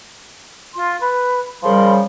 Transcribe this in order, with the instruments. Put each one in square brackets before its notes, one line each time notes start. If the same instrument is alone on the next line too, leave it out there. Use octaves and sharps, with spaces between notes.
[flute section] F4 C6
B4
[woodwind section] C#3 F3 G3 [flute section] A#4 B5 C6